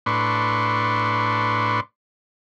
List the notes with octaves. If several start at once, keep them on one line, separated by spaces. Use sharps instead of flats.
A2 D4 B4 C6 C#6